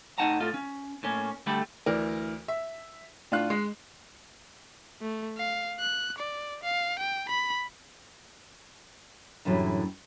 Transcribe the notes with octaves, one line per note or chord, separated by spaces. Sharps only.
A2 D#4 F#5 A5 A#5
A2 F4 A4
C#4
A2 A#3 C#4
D2 G3 A3 G4 A4 B5
D2 E3 A#4 D5
E5
A2 D4 F4 F5 F#6
G#3
A3
F5
F#6
D5
F5
G5
B5
F#2 A2 D3 E3 F#3 G3